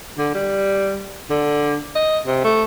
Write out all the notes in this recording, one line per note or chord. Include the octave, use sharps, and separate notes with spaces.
D3
G3
D3
D#5
C3
A3